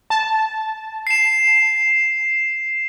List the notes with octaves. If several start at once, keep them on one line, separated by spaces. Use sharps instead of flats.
A5
C7 E7